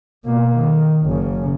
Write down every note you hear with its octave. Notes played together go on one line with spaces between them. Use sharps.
B2 A#3
D#3
F#1 C#3